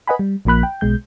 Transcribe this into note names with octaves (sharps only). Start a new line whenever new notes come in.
B4 D#5 F#5 G#5 B5
G3
A#1 F3 A#3 B5 F#6
G5
B1 B2 G#3 G6